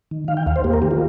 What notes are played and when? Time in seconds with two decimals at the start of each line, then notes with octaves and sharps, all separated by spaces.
0.11 D#3
0.28 D#3 F5
0.37 G5
0.46 D#2 F5
0.56 C5
0.64 A#3 G4
0.73 A#4
0.82 D#3 G4
0.91 F4